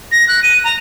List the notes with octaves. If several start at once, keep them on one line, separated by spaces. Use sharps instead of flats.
A#6
F#6
D#7
A#5